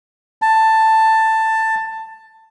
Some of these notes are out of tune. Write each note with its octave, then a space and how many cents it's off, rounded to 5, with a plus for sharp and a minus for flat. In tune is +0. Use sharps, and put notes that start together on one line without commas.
A5 +10